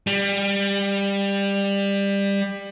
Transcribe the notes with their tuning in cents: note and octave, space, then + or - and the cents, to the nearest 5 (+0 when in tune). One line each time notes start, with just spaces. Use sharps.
G3 +20